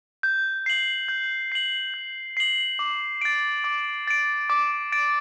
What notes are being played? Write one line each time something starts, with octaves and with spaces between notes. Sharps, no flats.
G6
C7 F#7
G6
C7 F#7
G6
C7 F#7
D6
A6 D7
D6
A6 D7
D6
A6 D7